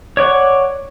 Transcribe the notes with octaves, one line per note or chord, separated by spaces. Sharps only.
C#5 D5 F#5 C#6